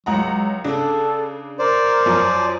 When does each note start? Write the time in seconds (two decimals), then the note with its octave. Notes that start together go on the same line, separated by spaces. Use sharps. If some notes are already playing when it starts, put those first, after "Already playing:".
0.06 C#2 F#3 F#5 A#5
0.64 C#3 D4 A4
1.59 A#4 C5 D5
2.06 F#2 F3